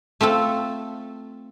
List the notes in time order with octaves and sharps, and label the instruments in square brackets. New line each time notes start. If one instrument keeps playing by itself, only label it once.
[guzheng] A3 C4 F4 A4